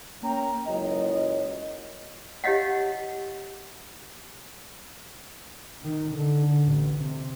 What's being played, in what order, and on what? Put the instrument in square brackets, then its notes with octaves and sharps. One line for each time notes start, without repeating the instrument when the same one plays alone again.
[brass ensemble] A#3 C#4 G5 A#5
F#1 C#2 F#2 C#5 D#5
[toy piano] E4 G4 C#5 D#5 F5 F#5
[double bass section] D#3
D3
A1
C3